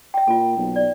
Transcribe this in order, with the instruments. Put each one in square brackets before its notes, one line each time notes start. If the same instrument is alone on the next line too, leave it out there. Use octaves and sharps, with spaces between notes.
[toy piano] E5 G5
[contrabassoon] A#2 [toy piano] F4 A4
[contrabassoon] B1
[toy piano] D5